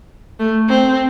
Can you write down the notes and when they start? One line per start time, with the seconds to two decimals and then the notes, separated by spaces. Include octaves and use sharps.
0.39 A3
0.69 C4